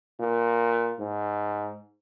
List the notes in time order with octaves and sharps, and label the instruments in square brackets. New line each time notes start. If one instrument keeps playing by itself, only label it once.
[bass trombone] A#2
G#2